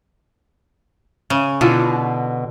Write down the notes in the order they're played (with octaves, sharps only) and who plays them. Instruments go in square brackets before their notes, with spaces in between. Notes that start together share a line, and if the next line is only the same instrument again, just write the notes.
[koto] C#3
[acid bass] B2 [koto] D3 [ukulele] E4 F4